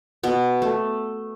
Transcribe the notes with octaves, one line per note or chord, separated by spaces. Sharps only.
B2 B3
A3